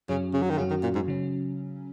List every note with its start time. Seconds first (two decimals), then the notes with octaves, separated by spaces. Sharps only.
0.09 F#2 C#3 F#3 C#4
0.34 C#3
0.42 F#3
0.50 D#3
0.58 F#2 C#3 F#3 C#4 F#4
0.70 D#3
0.83 A#2
0.95 G#2
1.08 C#3 F#3 C#4